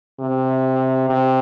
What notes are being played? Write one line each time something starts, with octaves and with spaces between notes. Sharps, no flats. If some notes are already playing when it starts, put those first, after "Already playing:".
C3
C3